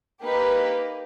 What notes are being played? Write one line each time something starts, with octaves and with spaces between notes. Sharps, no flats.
A#3 D#4 G4 B4